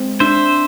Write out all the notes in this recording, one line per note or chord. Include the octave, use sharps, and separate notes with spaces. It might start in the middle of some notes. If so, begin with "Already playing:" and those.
Already playing: G#3 C4
D4 C5 E5